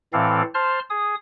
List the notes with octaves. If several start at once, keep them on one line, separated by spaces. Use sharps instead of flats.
A2 E3 C4 A4 D5 F5
C5 A5 C6 F6
G#4 D#6